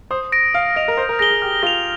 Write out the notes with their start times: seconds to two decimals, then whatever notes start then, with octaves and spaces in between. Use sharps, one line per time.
0.11 C5 D#6
0.32 A#6 D7
0.54 F5 F6
0.76 D#5 A#6 D7 F7
0.88 A#4
0.97 C5 G6
1.09 A#4
1.19 G#4 A#6 D7 G7
1.30 G#4
1.42 G4 F6
1.63 F4 A#6
1.67 F7